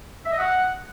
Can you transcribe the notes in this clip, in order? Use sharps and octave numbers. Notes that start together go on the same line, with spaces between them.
E5
D#5
F#5